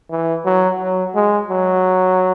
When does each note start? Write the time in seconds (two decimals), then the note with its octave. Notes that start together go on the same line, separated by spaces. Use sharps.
0.10 E3
0.45 F#3
0.81 F#3
1.15 G#3
1.50 F#3